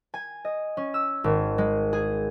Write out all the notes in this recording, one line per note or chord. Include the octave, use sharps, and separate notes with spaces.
G#5
D#5
C#4
E6
G#1
G#3
G#4